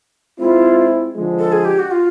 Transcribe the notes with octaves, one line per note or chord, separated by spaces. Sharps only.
G#3 C4 E4 F4
D3 F3 G#3
A4
G#4
G4
F#4
F4